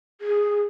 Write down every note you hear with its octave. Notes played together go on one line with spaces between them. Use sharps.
G#4